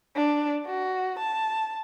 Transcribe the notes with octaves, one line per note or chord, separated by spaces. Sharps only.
D4
F#4
A5